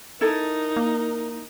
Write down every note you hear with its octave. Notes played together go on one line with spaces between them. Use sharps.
D#4 E4 A4 A#4
A#3